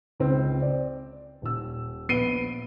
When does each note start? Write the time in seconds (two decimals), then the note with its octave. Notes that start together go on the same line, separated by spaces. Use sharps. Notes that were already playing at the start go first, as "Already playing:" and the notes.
0.20 C#2 C4
0.62 D5
1.42 D#1 E6
2.09 A#1 B3 C7 D7 D#7 G7